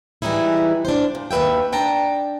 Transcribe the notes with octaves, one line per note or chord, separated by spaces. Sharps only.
E3 G3 G#3 D#4 E4
D4 C5
A#2
D#2 D#3 B4 E5 G5
D4 G5 A5 A#5